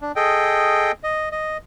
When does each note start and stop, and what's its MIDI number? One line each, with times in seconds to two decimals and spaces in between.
0.01 0.12 62
0.16 0.92 68
0.16 0.92 69
0.16 0.92 75
0.16 0.92 79
1.03 1.29 75
1.32 1.58 75